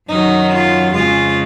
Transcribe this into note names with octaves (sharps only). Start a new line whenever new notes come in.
F#2 D#3 F#3 D#4
F4
F2 C#3 G#3 F4